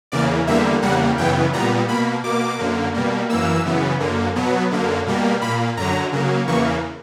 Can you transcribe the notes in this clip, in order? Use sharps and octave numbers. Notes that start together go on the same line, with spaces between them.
E2 C#3 E3 A#3 D5
E2 D3 G3 A#3 E5
E2 C#3 G3 A#3 F#5
F#2 C#3 E3 B3 G5
A#2 G3 B3 A#5
B2 A#3 B5
B2 A#3 D6
F#2 D3 A#3
B2 G3 A#3
F#2 E3 A#3 E6
F#2 C#3 E3 B3
F#2 D3 A#3
B2 F#3 B3
F#2 D3 A#3
B2 G3 A#3
A#2 A#3 B5
F#2 D3 F#3 A#5
C#3 F#3 A#3
E2 C#3 E3 A#3 C#6